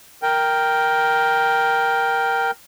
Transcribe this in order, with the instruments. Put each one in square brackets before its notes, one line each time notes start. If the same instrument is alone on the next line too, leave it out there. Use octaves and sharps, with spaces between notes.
[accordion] A#4 G5